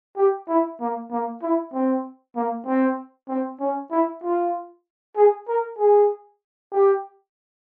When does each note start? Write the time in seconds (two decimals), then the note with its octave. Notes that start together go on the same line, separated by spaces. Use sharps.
0.17 G4
0.48 E4
0.80 A#3
1.11 A#3
1.43 E4
1.74 C4
2.36 A#3
2.67 C4
3.29 C4
3.60 C#4
3.91 E4
4.24 F4
5.16 G#4
5.48 A#4
5.78 G#4
6.72 G4